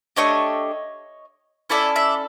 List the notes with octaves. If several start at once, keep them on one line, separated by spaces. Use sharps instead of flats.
A3 D4 G4 C#5 D#5
C#4 E4 A4 D5 E5
D5 E5